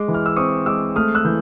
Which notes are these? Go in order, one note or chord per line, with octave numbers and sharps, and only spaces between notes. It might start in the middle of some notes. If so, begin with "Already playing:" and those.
Already playing: G#3 D6
E3
F6
E6
C4 C#6 D#6
G#3 D6 E6
A3 D#6 F6
E6 F#6
E3 G6